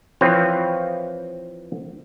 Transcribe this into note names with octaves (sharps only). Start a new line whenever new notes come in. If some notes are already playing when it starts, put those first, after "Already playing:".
E3 F3 C4 B4 C#5